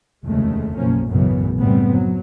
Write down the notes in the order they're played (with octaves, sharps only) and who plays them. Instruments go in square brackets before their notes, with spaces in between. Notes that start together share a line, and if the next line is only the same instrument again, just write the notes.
[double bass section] F1 D#2 C#3 G#3 A3
F#1 B1 F3 A#3 C#4
B1 F#2 A2 C#3 E3 B3
F#1 E2 A2 G3 B3 C4
F#3